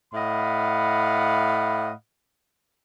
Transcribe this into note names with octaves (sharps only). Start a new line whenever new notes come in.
A2 D#5 F5 F#5 B5